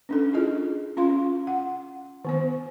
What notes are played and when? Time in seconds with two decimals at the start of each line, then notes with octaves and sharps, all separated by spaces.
0.09 C#4 D4 A4
0.33 E4 F4 G#4 D#5
0.97 C#4 F4 F5 C6
1.47 F#5
2.25 D#3 B3 C5